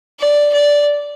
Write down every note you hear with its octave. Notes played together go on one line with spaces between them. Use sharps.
D5
D5